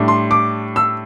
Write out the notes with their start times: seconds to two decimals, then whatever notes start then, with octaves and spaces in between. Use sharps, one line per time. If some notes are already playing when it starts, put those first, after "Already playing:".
Already playing: A2 G3 D4
0.08 C6
0.31 D6
0.76 E6